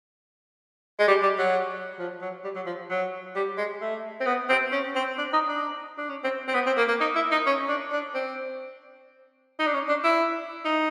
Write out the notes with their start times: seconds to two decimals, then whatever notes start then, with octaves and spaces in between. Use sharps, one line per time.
0.99 G#3
1.08 G3
1.22 G3
1.38 F#3
1.99 F3
2.21 F#3
2.44 G3
2.55 F#3
2.66 F3
2.90 F#3
3.35 G3
3.58 G#3
3.81 A3
4.21 C4
4.26 B3
4.49 C4
4.72 C#4
4.95 C4
5.18 D4
5.33 D#4
5.48 D4
5.98 D4
6.09 C#4
6.24 C4
6.48 C4
6.54 B3
6.66 C4
6.77 A#3
6.88 A#3
7.01 D#4
7.15 E4
7.31 D#4
7.46 C#4
7.68 D4
7.92 D4
8.14 C4
9.59 D#4
9.67 D4
9.74 C#4
9.89 D4
10.04 E4
10.65 D#4